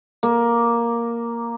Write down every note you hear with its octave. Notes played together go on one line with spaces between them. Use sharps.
A#3